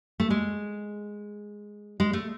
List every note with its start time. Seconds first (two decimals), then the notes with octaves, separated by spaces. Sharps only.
0.20 A3
0.30 G#3
2.00 G#3
2.13 A3